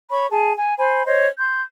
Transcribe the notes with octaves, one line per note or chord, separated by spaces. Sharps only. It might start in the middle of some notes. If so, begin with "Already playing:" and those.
C#5 B5 C#6
G#4 A5
G#5
C5 G#5 B5
C5 C#5 D#5
C6 G6